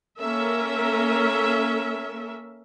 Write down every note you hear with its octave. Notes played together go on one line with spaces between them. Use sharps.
A#3 C#4 A4 A#4 E5